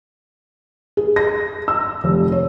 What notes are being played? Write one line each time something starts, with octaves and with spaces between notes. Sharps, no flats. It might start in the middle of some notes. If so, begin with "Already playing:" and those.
G#4
A#6
E6
F1
C#5